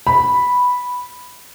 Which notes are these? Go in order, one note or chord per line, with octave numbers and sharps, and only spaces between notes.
B5